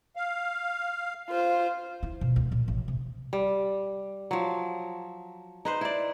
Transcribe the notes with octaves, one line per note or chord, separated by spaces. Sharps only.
F5
F4 C5
E4
B2
D2
A#2
A1
C3
G3
F3 F#3
D#4 B4 C5
E4 D5